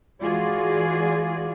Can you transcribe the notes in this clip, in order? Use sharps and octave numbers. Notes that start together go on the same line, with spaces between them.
E3 G#3 F4 F#4 G#4 D5